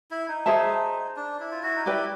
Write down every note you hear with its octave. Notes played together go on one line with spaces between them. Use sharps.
E4
D#4
G#4 C5 E5 A5
D4
E4
F4
E4 F#4
D#4
E4 G4 B4 D5 G5